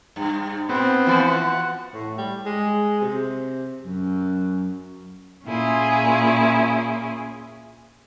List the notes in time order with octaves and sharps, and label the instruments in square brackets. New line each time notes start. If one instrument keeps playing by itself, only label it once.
[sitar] G2
[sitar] A#2 [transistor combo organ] B3 C4
[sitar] E3 F3 F#4
[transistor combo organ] F#5
[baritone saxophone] A2
G3
G#3
C3
F#2
[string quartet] A#2 C#4 E4 F4 G#4